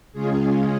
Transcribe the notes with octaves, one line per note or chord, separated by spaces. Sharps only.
C#3 G#3 C#4 F4 G#4